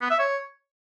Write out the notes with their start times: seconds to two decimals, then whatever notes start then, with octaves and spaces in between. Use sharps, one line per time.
0.01 B3
0.10 E5
0.19 C#5